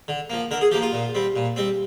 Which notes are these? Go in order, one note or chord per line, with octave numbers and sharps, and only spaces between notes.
D3
F3 A#3
D3 A#4
G#4
F3 A#3 G4
F4
A#2
G3 C4
A#2
G3 C4